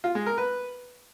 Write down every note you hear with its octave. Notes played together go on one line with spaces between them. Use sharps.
F4
G#3
A#4
B4